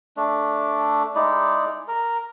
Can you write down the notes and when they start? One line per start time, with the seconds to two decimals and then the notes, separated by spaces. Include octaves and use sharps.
0.17 A3 D4
1.15 G#3 D#4 E4 D5
1.88 A#4